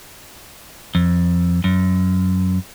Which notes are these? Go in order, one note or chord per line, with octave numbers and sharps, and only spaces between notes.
F2
F#2